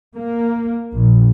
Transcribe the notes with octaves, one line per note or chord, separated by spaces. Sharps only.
A#3
A#1